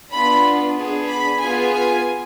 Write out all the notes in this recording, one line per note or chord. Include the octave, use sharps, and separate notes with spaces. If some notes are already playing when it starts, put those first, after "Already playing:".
B3 D4 F4 B5
B3 D4 G#4
B5
B3 F4 G#4 G#5
G#5